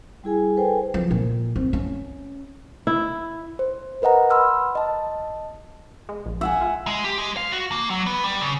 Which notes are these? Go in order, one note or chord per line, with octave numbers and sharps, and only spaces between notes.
G3 E4 G#4 G#5
A4 B4 C5 G5 G#5
F3
A#2
C4
C#4
E4
C5
A#4 B4 D#5 F#5 A#5
B5 C6 E6 F6
D#5 A5
G#3
A#1
E5 F#5 G#5
F4
G#3
G4
G#3
F5
F#4
A#3
F#3
B3
G3
C#3